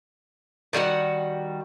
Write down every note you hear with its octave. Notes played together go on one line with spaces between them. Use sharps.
D#3 G3 F#4 F#5